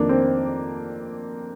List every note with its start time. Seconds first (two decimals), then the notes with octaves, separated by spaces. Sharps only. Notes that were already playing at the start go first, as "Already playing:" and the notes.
Already playing: F2 D#3 A#3 D4
0.09 C4